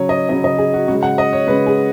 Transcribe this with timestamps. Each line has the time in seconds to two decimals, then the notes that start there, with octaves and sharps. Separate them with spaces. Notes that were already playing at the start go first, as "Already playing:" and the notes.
Already playing: C#3 F#3 C#5
0.09 D#5
0.29 C#3 F#3 D#5
0.44 D#5
0.58 G#4
0.74 F#4
0.88 C#3 F#4
0.91 G#3
1.03 F#5
1.18 D#5
1.33 C#5
1.47 C#3 G#3 B4
1.67 G#4